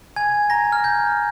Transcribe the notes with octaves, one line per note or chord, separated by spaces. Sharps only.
G#5 G#6
A#5 A#6
F6
G6